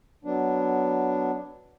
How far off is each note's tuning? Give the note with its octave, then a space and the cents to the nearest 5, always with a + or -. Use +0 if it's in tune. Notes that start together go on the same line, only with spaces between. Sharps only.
F#3 +0 B3 +5 D4 +0